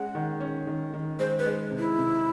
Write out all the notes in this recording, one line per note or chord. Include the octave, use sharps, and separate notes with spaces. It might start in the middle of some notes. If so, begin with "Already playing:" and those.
Already playing: G#3 C#4 F#5
D#3
C#4
D#3
D#3
G#3 C5
B4
G#3
C3
E4
C3